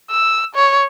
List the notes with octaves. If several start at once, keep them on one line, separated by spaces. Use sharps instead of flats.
E6
C#5